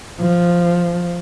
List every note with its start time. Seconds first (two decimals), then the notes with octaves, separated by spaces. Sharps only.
0.21 F3